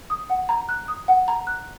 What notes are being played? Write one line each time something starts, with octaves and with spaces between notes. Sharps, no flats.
D#6
F#5
A#5
F#6
D#6
F#5
A#5
F#6